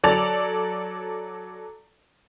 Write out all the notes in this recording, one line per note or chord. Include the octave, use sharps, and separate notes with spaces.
F#3 A4 D5 A5 A6 F7